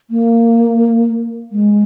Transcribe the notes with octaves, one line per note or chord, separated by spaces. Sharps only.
A#3
G#3